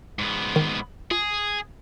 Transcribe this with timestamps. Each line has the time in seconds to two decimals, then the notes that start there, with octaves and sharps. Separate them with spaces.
0.19 G#2 B3
0.56 D#3
1.11 F4 G#4